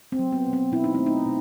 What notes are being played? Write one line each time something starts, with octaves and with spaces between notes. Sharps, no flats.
C4
F#3
B3
B2
C4
B2 E4
D#4
A3 C4
D#4
B2